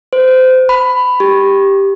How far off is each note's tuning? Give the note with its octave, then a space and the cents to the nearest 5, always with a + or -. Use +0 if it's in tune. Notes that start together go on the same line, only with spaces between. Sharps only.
C5 -25
B5 +15
G4 +5